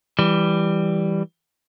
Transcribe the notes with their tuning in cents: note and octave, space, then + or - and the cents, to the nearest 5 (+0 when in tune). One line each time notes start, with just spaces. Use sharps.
E3 +0 G3 +0